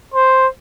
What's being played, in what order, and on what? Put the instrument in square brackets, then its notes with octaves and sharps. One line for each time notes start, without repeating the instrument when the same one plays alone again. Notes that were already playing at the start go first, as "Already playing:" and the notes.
[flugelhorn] C5